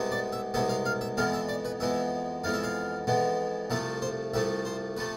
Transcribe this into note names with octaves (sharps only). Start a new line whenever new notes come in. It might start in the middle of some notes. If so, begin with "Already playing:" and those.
Already playing: C2 C3 G#3 B3
D5
E5
C2 C3 G#3 B3 E5
F5
F5
E5
F2 E3 G#3 B3 F5
E5
D5
B4
F2 E3 G#3 B3 E5
F2 E3 G#3 B3 F5
E5
F5
F2 E3 G#3 B3
C2 C3 F3 A3 E5
C5
C2 C3 F3 A3 E5
C5
C3 F3 A3 B4